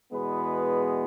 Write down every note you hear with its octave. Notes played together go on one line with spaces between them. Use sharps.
E2 B2 G#3 B3 B4